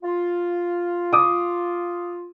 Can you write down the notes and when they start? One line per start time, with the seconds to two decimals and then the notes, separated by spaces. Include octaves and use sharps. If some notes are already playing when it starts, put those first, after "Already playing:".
0.04 F4
1.13 D6 D#6